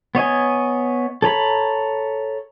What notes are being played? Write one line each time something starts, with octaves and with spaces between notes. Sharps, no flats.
B3 C#5 D#5 G#5
A4 C#5 A#5 B5